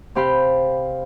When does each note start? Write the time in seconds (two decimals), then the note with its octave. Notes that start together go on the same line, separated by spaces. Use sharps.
0.15 C3 C4 G4 F5 B5 G6